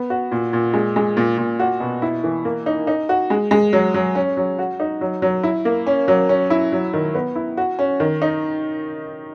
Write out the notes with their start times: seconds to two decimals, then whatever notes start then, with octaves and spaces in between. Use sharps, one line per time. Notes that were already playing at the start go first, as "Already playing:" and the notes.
Already playing: B3
0.10 F#4
0.32 A#2
0.53 A#2
0.73 G#3
0.96 G#3
1.17 A#2
1.38 A#2
1.60 F#4
1.80 B2
2.02 E4
2.24 E3
2.45 A#3
2.66 D#4
2.87 D#4
3.09 F#4
3.30 G#3
3.51 G#3
3.73 F#3
3.94 F#3
4.15 C#4
4.37 F#3
4.59 F#4
4.80 D#4
5.01 F#3
5.22 F#3
5.43 E4
5.65 A#3
5.87 C#4
6.08 F#3
6.29 C#4
6.50 E4
6.72 F#3
6.93 D#3
7.15 B3
7.35 E4
7.57 F#4
7.79 C#4
8.00 D#3
8.22 D#4